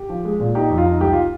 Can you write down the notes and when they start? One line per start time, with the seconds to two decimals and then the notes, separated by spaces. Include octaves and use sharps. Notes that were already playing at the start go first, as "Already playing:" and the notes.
Already playing: G4
0.09 F3
0.25 G#3
0.40 A#2
0.55 D#4 G4
0.70 F2
0.78 F4
0.85 D#4
1.01 C2 G4
1.13 F4